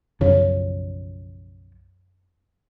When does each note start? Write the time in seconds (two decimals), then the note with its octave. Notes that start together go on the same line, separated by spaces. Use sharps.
0.21 B1 F#2 C#3 F3 C#5